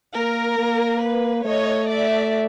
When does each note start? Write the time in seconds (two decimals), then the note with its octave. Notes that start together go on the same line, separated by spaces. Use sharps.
0.15 A#3 A#4
0.59 A#3
1.02 B4
1.45 A3 C#5 D#5
1.88 D5 E5